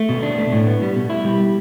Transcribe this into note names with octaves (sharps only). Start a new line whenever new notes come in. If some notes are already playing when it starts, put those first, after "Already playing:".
Already playing: A3
B2
D4
A3
A2
B3
G3
B2
E4
G3